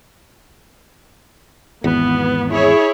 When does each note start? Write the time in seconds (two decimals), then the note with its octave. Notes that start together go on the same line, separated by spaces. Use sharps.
1.84 G#1 E2 B3
2.50 E4 G#4 C#5